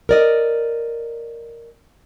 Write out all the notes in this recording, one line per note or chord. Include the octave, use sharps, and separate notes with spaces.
A#4 D5 D#5